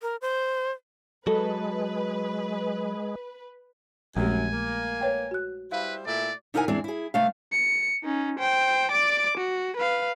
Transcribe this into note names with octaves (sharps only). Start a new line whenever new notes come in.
A#4
C5
F#3 G#3 A4 B4
A#1 F#2 G#3 A3 G4 G#5
A#3
B4 C#5 G5
F#4 F#6
G3 E4 B4 C5 F5
A#2 A3 E4 D5
C3 D#4 E4 A#4 F#5 G#5
E2 E3 G#3 C4 D4
E4 G#4
C3 A3 F5
C#7
C#4 D#4
C5 G5
D5 D6
F#4
B4 F5